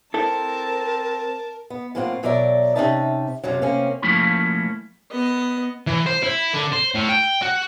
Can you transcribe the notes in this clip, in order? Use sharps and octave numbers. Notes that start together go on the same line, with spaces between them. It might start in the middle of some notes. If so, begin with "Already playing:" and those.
C4 E4 A4 A#4 A5
B3
A2 F#3 A#3 C4 F4 F#5
B2 F#3 A#4 D5 E5 A#5
C3 A#3 C#4 D#4 E5 A5
F#2 C3 F3 F#3
C3 A#3 C4 C#4
F3 A3 A#3 C#4 E4 B5
B3 D#5
E3
C5
E4
D3
C5
A2
G5
F#4